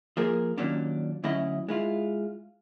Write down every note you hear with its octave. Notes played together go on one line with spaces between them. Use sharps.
F3 A#3 G#4 A#4
D#2 A#2 F#3 C#4 D4
D2 F#3 C#4 E4 D#5
G#3 E4 F4